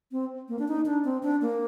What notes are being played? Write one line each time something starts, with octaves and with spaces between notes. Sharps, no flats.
C4
A#3
D4
D#4
D4
C4
D4
A#3